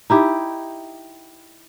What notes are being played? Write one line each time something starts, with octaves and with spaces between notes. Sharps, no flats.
D#4 E4 G4